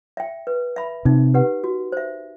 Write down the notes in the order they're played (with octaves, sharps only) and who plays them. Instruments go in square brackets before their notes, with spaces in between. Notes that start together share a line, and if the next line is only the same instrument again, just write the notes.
[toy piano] E5 G5
B4
E5 B5
[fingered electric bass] C3 [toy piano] D#4
[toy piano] G4 B4 F#5
F#4
C5 E5